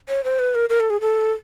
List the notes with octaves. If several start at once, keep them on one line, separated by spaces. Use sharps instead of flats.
C#5
C5
B4
A#4
A#4
A4
G#4
A4